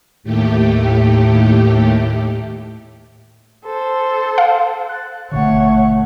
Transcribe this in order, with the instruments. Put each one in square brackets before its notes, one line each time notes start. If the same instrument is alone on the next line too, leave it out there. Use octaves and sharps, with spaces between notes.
[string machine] D#2 A2 A3 G4
[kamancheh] A4 C5
[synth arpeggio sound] F5
[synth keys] F#6 A6
[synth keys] G#1 B2 D3 [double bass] A3 [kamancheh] C#5 F#5